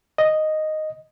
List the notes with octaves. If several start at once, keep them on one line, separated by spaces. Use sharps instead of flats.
D#5